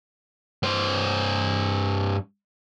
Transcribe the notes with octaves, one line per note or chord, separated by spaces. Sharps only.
G2 C5